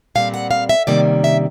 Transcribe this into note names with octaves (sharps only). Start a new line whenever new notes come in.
A#2 G3 C4 F5
F#5
F5
E5
C3 D#3 G3 A#3 C#4 D5
E5